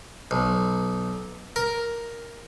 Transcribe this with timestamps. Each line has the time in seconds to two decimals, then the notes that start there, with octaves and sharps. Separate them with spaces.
0.31 B1
1.56 A#4